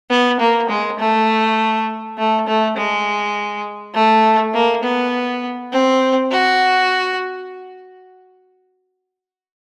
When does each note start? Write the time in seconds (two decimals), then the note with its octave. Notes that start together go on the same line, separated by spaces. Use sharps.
0.10 B3
0.40 A#3
0.69 G#3
0.99 A3
2.18 A3
2.47 A3
2.77 G#3
3.95 A3
4.54 A#3
4.83 B3
5.73 C4
6.32 F#4